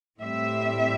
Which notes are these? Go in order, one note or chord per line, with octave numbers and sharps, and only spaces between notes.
A2 G3 C4 E5